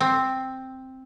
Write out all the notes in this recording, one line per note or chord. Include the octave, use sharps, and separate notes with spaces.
C4